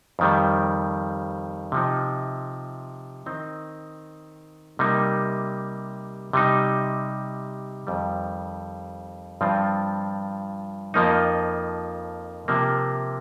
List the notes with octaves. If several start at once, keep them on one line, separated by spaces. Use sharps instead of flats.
F2 D#3 G3
C3 F3 D#4
D#3 C4 D#4
C3 G3 A#3 D#4
C3 G3 D#4
F2 D#3 G3
G2 F3 C4 F4
F2 F3 A#3 D#4
C3 F3 A#3